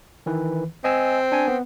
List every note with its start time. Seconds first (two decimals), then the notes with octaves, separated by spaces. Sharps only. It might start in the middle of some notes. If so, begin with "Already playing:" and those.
0.26 D#3 E3 B4
0.84 C4 D#5 G#5 E6
1.32 D4 G#5
1.48 B3